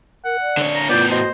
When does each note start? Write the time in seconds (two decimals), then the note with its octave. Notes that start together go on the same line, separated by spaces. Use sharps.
0.25 A#4 F#5
0.41 D5
0.57 D3 C#5
0.75 A#5
0.89 A2 B3 F4 D5 G6
1.11 F#4 C5 D#5